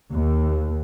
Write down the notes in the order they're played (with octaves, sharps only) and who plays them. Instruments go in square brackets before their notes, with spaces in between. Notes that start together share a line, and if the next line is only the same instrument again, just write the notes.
[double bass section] D#2